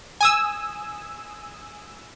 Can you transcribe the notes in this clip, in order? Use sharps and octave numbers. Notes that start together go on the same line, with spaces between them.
G#5 D#6 E6